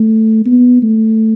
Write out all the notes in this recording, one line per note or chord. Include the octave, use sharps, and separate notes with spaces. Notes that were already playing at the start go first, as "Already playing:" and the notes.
Already playing: A3
B3
A3